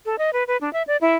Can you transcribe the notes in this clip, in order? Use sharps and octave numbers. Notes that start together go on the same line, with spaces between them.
A4
D#5
B4
B4
D4
E5
D5
E4